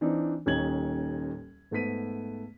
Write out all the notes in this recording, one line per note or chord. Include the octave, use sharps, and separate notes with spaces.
E3 C4 D4 D#4
D#1 D#2 C#4 D#4 G#6 F#7
G#2 A3 B3 B6 D#7